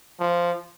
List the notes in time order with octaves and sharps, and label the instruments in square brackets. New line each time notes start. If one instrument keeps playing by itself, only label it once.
[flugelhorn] F3